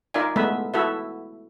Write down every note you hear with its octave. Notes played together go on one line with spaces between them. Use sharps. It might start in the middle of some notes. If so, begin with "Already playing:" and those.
D#4 F4 A#4 D5 E5 G#5
G#3 A3 B3 B4 E5
E4 F#4 A4 B4 E5